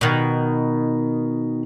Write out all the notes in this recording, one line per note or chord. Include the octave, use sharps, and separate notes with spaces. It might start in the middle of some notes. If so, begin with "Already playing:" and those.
B2 D#3